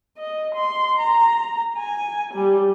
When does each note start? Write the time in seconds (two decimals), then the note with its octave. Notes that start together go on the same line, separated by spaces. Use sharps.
0.18 D#5
0.55 C6
0.99 A#5
1.78 G#5
2.34 G3